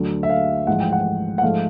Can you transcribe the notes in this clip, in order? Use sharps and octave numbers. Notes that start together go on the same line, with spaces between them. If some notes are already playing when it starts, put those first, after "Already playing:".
Already playing: D2 D3 F#3
E5
F5
A1 G#2 F3 F#5
G5
F#5
F#5
G#2 F3 A3 F5